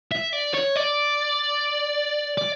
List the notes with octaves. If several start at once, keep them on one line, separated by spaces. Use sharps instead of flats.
E5
D5
C#5
D5
D5